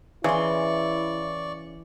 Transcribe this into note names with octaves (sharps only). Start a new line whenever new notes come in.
C#3 E3 E4 D5 C6 C#6